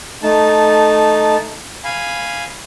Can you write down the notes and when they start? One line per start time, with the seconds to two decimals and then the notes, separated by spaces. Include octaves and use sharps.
0.23 A3 D#4 A5
1.84 F5 G#5 B5